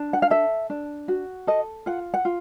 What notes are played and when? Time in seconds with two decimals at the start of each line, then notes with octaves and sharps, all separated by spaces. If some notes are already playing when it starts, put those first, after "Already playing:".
Already playing: D4
0.13 F#5
0.22 F5
0.30 A4 E5
0.70 D4
1.08 F#4
1.47 A4 D#5
1.86 F4 F#5
2.14 F#5
2.25 F4